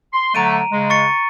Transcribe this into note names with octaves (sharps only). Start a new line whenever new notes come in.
C6
D3 F#3 A3 A#5 D7 D#7
C#3 G#3
C#6 A6 C#7